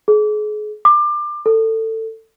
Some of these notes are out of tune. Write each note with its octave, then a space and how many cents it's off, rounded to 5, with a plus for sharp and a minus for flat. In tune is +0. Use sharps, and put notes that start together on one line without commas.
G#4 +35
D6 +25
A4 +20